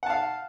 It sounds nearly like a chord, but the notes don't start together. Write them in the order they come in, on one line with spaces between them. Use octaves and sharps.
F#5 A5 F5